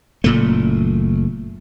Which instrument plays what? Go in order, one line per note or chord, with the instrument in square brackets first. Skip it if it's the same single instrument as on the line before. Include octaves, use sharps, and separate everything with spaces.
[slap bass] F#1 A#2 A3